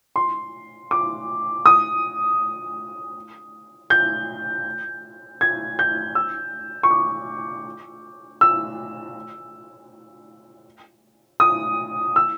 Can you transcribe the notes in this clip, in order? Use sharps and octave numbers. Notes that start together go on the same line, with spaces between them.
C6
D6
D#6
G6
G#6
G6
E6
C#6
D6
E6
D#6
E6